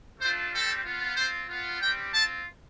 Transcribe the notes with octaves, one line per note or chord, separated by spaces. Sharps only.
A3 D4 F4 C5
G3 C4 G4 A4
B3 F4
C4 F4 C5
B3 F4
G3 C4 G4 G5
C4 F4 A5